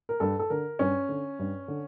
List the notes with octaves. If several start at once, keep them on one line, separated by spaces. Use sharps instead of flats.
A#4
G2 A4
A4
D3 A#4
G2 C#4
D3
G2
D3